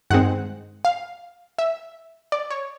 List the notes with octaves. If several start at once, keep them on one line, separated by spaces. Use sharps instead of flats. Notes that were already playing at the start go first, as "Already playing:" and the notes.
G2 D#3 G#3 C4 F#5
F5
E5
D5
C#5